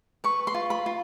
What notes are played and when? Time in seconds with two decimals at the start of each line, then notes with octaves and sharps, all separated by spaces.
0.24 B4 C#6
0.47 C6
0.54 F4
0.70 B5
0.86 F4